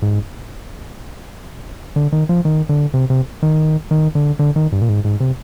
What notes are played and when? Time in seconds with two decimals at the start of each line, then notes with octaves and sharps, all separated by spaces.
0.02 G#2
1.96 D3
2.12 D#3
2.29 F3
2.45 D#3
2.69 D3
2.94 C3
3.10 C3
3.43 D#3
3.91 D#3
4.15 D3
4.39 D3
4.56 D#3
4.72 G2
4.82 A#2
4.89 G#2
5.05 G#2
5.20 C3